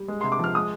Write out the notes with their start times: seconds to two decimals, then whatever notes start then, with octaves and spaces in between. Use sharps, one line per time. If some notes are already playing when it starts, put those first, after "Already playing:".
Already playing: G3
0.08 G#3
0.21 C6
0.24 C3
0.32 D6
0.39 F3 F6
0.55 G#3 D#6